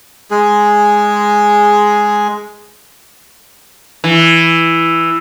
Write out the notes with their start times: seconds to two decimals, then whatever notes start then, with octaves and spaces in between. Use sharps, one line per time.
0.31 G#3 G#4
4.04 E3